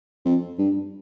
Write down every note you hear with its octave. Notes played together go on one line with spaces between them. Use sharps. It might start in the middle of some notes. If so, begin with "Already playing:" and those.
F2
G2